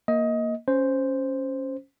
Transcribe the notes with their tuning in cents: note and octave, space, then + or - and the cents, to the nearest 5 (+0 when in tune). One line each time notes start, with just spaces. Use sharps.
A#3 +0 D#5 +20
C#4 -5 C5 +0